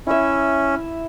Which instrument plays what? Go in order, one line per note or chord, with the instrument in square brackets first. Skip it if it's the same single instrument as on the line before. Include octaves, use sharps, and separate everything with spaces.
[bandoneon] C#4 [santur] E4 E5